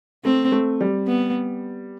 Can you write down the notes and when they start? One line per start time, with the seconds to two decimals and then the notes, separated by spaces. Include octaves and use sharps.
0.24 A3 C4
0.52 A3
0.81 G3
1.07 B3